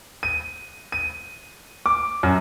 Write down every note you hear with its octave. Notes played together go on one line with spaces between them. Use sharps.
D#7
D#7
D6
F#2